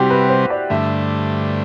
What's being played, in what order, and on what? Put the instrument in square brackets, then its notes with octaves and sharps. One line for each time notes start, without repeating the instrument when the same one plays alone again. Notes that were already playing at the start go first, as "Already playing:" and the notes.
Already playing: [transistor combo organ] C3 G3 C4 [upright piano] E4 F#4 G4
[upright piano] B4
C5
D5
[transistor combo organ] G2 D3 A3 [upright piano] E5